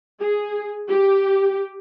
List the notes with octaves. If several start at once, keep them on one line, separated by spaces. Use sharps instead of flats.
G#4
G4